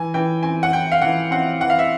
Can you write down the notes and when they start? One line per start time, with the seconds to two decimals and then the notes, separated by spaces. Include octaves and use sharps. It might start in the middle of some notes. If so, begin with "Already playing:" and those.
Already playing: E3 G#5
0.14 E3 G5
0.43 C4 G#5
0.63 F#5
0.72 E3 G5
0.92 F5
1.02 E3 F#5
1.31 C4 F#5
1.60 E3 F#5
1.70 F5
1.79 E5